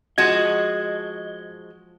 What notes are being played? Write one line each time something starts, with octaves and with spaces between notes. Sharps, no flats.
F3 G#3 F#4 D#5 G#6